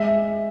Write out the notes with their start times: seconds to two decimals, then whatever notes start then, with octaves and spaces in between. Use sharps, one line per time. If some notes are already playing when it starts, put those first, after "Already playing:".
Already playing: G#3 E5